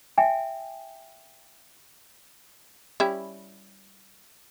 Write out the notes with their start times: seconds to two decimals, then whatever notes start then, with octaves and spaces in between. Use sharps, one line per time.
0.18 E5 G5 G#5
3.00 G3 C#4 E4